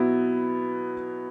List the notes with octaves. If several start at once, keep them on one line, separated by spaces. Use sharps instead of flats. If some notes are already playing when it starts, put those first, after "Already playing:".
Already playing: B2 F#3 B3 E4